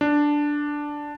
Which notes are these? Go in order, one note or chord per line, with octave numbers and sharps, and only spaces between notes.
D4